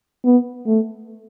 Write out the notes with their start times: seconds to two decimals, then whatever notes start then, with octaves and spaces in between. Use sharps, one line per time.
0.25 B3
0.67 A3